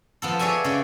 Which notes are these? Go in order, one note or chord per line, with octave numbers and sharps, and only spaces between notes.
F3 B3 A4
G#4 C#5 D5 E5 G#5
C#3 D5